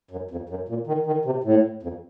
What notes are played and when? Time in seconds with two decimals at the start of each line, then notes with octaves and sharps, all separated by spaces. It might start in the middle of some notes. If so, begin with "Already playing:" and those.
0.11 F#2
0.31 F2
0.49 F#2
0.69 A#2
0.87 D#3
1.06 D#3
1.25 C3
1.44 A2
1.83 F2